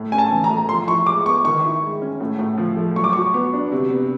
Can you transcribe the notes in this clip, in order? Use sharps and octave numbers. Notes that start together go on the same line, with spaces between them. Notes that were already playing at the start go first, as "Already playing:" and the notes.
Already playing: A2
C#4 G#5
A5
E3
A#5
A3
F3 C6
E4 C#6
G#3 D6
B3 C#6
D#3 C#6
E4
G#3
C#4
A2
A2
F3
A3
F#3 C#6
D6
F#4 C#6
B3
D4
C3
B3